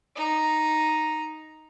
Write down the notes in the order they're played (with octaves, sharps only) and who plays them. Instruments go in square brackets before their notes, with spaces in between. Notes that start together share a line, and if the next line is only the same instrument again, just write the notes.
[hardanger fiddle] D#4 A#5